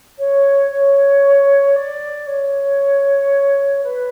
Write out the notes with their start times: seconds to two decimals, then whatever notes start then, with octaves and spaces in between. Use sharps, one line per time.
0.18 C#5
0.70 C#5
1.75 D5
2.26 C#5
3.83 B4